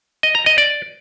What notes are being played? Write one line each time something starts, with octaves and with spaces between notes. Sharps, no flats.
D#5
A#5
D#5
D5